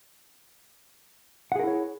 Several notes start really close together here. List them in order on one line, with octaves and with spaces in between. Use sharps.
F#5 G#4 A#4 E4 C#5